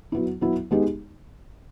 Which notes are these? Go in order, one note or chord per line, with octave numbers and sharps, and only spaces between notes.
F#3 B3 E4
F#3 B3 E4
G#3 B3 D#4 G4